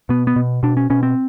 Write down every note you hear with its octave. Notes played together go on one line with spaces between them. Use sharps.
B2 B3
B3
B2
B2 D4
C#4
B2 C#4
C4